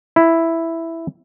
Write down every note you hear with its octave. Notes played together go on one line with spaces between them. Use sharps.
E4